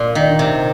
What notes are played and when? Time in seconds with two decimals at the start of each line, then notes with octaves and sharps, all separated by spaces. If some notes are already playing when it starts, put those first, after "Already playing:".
Already playing: A#2
0.15 D#3
0.39 C3